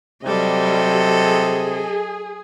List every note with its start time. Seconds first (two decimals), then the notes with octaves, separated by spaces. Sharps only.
0.24 C3 F#3 G3 A4 D#5
1.18 G#4